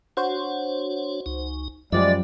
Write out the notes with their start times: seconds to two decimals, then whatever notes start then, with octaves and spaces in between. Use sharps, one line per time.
0.17 D4 F#4 C5 C#5
1.26 C#2 D#4
1.92 F#2 F3 G3 G#3 D5 E5